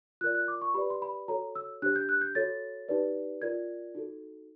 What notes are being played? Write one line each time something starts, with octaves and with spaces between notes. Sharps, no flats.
F4 A#4 D5 F#6
F#6
D6
C#6
G4 B4 D5 B5
C6
B5
F#4 A4 C#5 A#5
E6
D4 G4 C5 F#6
G6
F#6
G6
F#4 A4 C#5 A6
D#4 G4 B4 D5
F4 A#4 D5 G#6
D#4 F#4 A4